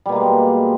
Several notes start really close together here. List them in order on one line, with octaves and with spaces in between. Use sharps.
G3 B2 A#3 G#3